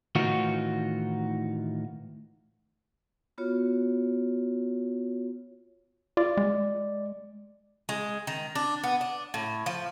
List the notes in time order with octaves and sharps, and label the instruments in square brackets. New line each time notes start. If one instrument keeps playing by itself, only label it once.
[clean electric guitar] A2 D#3 E3 D#4 F4 F#4
[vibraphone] B3 F4 F#4 C#5
[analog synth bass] F4 [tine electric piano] D5
[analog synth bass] G#3
[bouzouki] G#3
D#3
D4
B3
D4
A2
F3